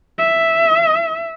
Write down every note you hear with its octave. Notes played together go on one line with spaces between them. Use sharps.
E5